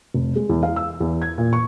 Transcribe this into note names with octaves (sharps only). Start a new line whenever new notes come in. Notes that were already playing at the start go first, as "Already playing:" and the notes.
F1
G#3
E2
F5
E6
E2
G#6
A#2
C#6